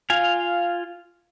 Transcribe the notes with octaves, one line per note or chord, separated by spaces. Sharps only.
F4 F5 G#5